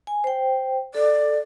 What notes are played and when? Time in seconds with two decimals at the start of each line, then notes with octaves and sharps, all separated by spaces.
0.07 G#5
0.24 C5 G5
0.95 A4 D5